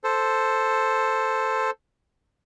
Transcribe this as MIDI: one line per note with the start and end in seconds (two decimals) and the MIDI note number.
0.04 1.70 69
0.04 1.70 72